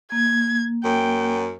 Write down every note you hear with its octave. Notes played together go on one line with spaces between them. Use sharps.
A#3 G#6
F#2 G5